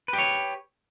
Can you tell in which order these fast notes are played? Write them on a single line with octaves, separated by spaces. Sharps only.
B4 G4 C#5